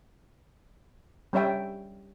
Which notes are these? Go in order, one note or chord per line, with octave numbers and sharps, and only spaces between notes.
G3 C#4 C#5 E5 G5